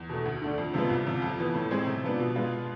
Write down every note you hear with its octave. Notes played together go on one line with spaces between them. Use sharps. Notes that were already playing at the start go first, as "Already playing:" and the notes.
Already playing: E2
B2 A3
D2
D3 A3 D4
F2
C3 F3 G#3 B3
C2
C3 F3
F2
E3 B3
A2
G#3 C4 G#4
C3
F3 B3 D4
B2
G#3 B3 F4